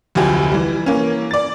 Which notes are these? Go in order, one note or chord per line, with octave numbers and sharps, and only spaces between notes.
F1 D2 F3 F#3 G4 G#5
E3 G3
E3 A#3 C#4
D5 A6